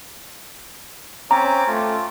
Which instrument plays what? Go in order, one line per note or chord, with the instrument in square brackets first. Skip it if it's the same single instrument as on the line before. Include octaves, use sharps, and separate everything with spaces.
[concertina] C4 D6 [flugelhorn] C#4 [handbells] A#5
[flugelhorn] A3 [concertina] F4